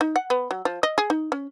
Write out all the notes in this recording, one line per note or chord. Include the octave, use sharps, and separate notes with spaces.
D#4
F#5
B3
F#3
F3
D#5
G#4
D#4
C#4